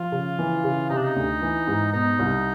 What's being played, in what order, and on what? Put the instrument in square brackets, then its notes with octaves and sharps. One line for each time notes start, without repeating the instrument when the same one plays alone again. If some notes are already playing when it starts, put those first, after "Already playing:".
Already playing: [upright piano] F3 [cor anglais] F4
[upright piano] C#3
E3
C#3
[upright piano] C3 [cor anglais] D#4
[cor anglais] D4
D#4
[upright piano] D2
E3
G#2
[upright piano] B2 [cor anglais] D#4
[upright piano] C2